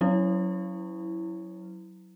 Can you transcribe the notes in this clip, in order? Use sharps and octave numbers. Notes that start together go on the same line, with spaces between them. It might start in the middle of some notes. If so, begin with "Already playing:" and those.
F#3 C#4 E4